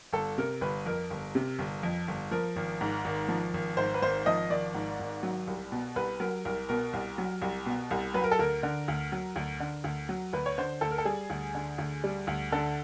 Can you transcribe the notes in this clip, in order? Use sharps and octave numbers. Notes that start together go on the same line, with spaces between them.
G1 A4
C3 A#4
G1 B4
F2 A#4
G1
C3
G1
F2
G1
F3 A#4
G#1
G#2
G#1
F3
G#1
G#2 C5
B4
G#1 C5
F3 D#5
G#1 D5
G#2
G#1
F#3
C2
B2
C2 B4
F#3 A#4
C2 A#4
B2 A#4
C2
F#3
C2
B2
C2
F#3 B4
A#4
A4
D2 A#4
D3
D2
F#3
D2
D3
D2
F#3
D2 B4
C#5
D3 C5
D2 A4
A#4
A4
G3 G#4
D2
D3
D2
G3
D2
D3 A4